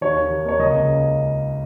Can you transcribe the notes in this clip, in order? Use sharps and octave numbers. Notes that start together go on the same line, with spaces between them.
D#2 C#5
D#3
D#2
A#3 C#5
C#2 D#5
C#3